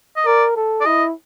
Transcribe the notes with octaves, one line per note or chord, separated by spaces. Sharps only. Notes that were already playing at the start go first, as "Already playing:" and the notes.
D#5
A#4 D5
A4
D5
E4 D#5